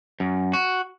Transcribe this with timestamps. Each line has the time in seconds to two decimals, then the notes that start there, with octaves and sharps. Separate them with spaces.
0.20 F#2
0.53 F#4